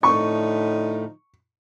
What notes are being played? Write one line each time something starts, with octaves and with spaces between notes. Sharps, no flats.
A2 D3 F3 A3 D#4 C#6